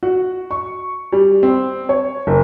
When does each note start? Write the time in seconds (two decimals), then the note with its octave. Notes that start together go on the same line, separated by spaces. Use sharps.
0.03 F#4
0.51 C#6
1.13 G3
1.43 C4
1.89 C#5
2.27 F#1